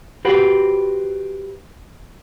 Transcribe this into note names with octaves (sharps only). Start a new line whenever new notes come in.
F#4 G4 B4 C5 F#5